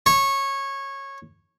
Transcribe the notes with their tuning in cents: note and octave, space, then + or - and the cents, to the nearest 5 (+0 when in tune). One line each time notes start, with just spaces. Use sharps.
C#5 -15